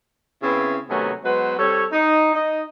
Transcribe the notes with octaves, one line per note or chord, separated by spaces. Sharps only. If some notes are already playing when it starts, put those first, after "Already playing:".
C#3 B3 C4 E4
C3 D#3 F#3 A3 B3 C#4
F#3 G#3 B3 B4 C5
G3 C4 A4 C#5
D#4
D#4 D#5